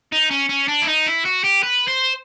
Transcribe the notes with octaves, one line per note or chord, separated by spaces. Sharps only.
D#4
C#4
C#4
D4
E4
D#4
E4
F#4
G4
B4
C5